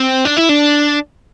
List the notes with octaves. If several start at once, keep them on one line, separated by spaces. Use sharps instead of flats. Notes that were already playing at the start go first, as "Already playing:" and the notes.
Already playing: C4
D4
E4
D4